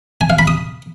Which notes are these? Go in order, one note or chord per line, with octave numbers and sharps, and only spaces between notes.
G#5
F5
B5
D#6